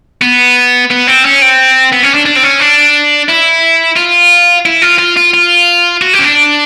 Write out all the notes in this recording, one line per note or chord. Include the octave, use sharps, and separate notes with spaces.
B3
B3
C4
C#4
C4
B3
C#4
D4
D4
C4
C#4
D4
E4
F4
E4
F4
F4
F4
F4
F#4
G4
C#4
D4